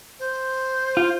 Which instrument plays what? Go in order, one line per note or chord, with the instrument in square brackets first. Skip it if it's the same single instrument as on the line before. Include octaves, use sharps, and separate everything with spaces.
[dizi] C5
[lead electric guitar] F4